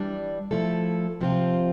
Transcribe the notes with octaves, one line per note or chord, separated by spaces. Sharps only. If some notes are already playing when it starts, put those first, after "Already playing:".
Already playing: E3 G3 D4
F3 A3 E4 A4
C3 F3 C4 F4